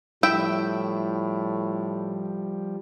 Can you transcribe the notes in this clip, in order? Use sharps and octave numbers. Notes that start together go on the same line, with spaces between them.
A2 F3 G3 E4 E5 G5